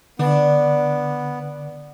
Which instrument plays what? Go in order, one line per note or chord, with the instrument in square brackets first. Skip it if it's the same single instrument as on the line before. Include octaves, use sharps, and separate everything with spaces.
[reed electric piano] D3 [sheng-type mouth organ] B3 [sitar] D4